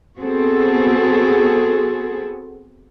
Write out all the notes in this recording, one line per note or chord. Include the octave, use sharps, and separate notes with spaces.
B3 C4 F#4 G#4 A4